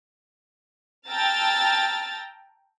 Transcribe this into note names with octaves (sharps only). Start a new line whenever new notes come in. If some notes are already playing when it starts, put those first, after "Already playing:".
G5 A5 A#5 E6 F6 A6